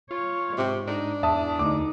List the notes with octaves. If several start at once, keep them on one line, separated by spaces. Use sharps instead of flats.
F4 C#5
G#2 C3
D4 D#4
E2 E5 A5 D#6
D2 D#4 D6